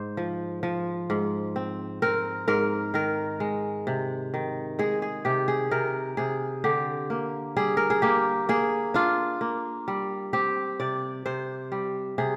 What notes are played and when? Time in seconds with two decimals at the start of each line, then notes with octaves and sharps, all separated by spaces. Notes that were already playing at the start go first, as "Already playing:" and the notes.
Already playing: G#2 C5
0.17 F3
0.63 F3
1.10 G#2
1.56 C4
2.02 C4 A#4
2.48 G#2 A#4
2.94 D#3 A#4
3.40 G#3
3.87 C3
4.34 D#3
4.79 G#3 G#4
5.02 G#4
5.25 C3 G4
5.48 G#4
5.71 C3 A#4
6.17 C3 G#4
6.64 D3 G4
7.10 A#3
7.57 G3 G#4
7.77 A#4
7.90 G#4
8.02 A#3 G4
8.49 A#3 G#4
8.94 D4 F4
9.41 A#3
9.88 G3
10.33 C4 G4
10.80 C3 D5
11.26 C3 C5
11.72 G3
12.18 C3 G#4